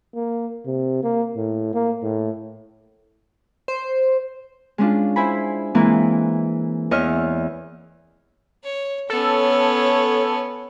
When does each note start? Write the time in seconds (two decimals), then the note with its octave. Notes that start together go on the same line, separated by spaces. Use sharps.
0.15 A#3
0.66 C3
1.03 A#3
1.37 A2
1.74 A#3
2.03 A2
3.68 C5
4.78 G#3 C#4 D4 F4
5.16 E4 C5 G#5 B5
5.75 E3 G#3 A#3 C4 E4
6.91 E2 C#5 D#5 E5 F6
8.64 C#5
9.10 B3 C#4 A4 C#5